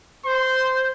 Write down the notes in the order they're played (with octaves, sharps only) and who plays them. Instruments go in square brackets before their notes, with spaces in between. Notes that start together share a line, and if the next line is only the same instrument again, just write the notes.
[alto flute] C5 [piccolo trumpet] C6